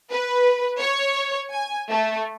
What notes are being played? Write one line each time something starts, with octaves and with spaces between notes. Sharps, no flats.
B4
C#5
G#5
A3